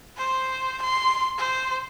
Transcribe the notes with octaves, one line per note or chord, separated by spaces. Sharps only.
C5
C6
C5